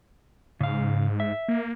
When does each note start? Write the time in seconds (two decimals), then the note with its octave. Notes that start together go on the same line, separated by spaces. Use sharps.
0.61 G#2 C#3 F5
1.20 E5
1.48 A#3